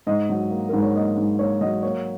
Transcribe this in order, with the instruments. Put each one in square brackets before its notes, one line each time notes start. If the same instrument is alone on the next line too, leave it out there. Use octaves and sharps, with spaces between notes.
[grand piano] G#2 D#5
F#3
A#3
G#2 A#4
C#5
A#3 D#5
G#2
A#3 C#5
F#3 D#5
A#3 C#5